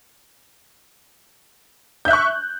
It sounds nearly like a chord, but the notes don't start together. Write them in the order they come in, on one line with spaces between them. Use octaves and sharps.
G6 E5 F#6 C#6